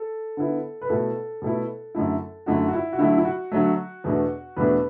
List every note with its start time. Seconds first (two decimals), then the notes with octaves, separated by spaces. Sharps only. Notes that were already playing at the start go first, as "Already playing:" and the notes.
Already playing: A4
0.37 D3 B3 E4
0.81 B4
0.89 B2 A3 E4 A4
1.42 B2 A3 E4
1.95 F#2 D3 A3 E4
2.46 F#2 D3 A3 E4 F#4
2.68 F#4
2.73 E4
2.93 F#4
2.99 D3 F#3 A3 E4
3.18 E4
3.25 F#4
3.52 D3 F#3 A3
4.04 E2 B2 A3 D4
4.57 E2 B2 A3 D4 B4